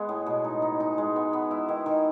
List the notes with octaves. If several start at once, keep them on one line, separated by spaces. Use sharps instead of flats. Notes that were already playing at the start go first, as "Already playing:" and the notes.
Already playing: G#3 B3
A2
B2
D#4
D#4
D#4
G#3
B3
B3
E4
D#3
D#3